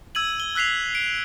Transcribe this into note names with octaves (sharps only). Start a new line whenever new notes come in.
E6 G#6 D#7 F#7
G7
E6 F#6 B6 C7 F7
D7